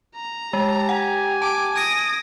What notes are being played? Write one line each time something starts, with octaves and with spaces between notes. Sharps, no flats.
A#5
G#3 G4 A5
F#5 G#5
A5 D6
D#6 G#6 A#6 D7